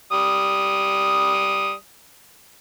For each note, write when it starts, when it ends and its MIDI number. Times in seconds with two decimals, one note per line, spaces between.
0.12 1.72 55
0.12 1.72 87